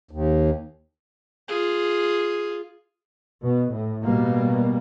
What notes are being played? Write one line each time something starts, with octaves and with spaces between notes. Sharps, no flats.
D#2
F4 G#4
B2
A2
B2 G3 A#3